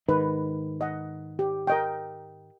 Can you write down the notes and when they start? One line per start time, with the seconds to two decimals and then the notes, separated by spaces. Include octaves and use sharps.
0.09 G#2 D#3 B4
0.81 D#5 F#5
1.39 G4
1.67 A#4 D#5 G5